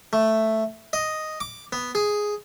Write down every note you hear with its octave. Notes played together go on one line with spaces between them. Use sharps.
A3
D#5
D6
B3
G#4